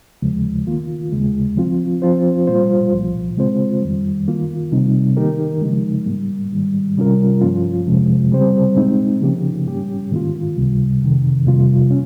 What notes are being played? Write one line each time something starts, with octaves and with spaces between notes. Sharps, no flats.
D#2 C#3 F3 G#3
D#3 A#3 F4
D#2 C#3 G#3
F3 C4 F4
F3 C4 F4 C5
A#2 G3 A#3 F4 C5
C2 A#2 F3
C#3 G#3 C4 F4 C5
F2 D#3 G3
D#3 A#3 F4
C3 G3 C4 D#4
D#3 A#3 D#4 G4 A#4
C#3 F3 G#3
G#2 G3 A#3
G#2 D#3 G3
C3 G3 C#4 F4 A#4
G2 F3 A#3 C#4 F4
F2 C3 F3 G#3
C#3 G3 C4 G4 C5
A#2 G#3 C4 D#4
C#3 F3 A#3 C#4 G4
G#2 G3 C#4 G4
G#2 D#3 A#3 F4
C#2 C3 G3
F2 C3 D#3
F2 C3 G3 A#3 F4
C#4